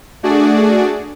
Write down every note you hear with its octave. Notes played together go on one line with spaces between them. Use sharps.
A3 D4 F#4 G#4 D5